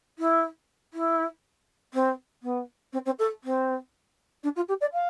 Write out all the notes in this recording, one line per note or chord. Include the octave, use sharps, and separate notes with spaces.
E4
E4
C4
B3
C4
C4
A4
C4
D4
F4
G4
D5
F5